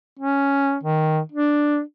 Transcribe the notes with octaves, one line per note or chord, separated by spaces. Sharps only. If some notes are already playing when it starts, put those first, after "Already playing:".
C#4
D#3
D4